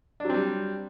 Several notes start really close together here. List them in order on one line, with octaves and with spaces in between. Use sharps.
D4 F#3 C4 G3